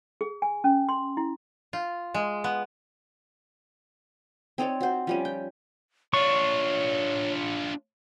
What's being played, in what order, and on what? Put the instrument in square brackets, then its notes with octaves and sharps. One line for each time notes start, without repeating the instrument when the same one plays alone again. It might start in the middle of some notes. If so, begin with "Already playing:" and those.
[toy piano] G#4
G#5
C#4
C6
E4
[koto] F4
G#3
B3
[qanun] C4 D#4 C#5 D5
F#4 C5
F3 G3 C#4
G5
[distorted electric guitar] D4 F4 [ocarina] C#5 [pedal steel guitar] C#6